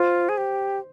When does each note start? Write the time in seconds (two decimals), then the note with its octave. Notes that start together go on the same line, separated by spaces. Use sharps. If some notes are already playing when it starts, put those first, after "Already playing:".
Already playing: F4 C5
0.29 G#4
0.37 G4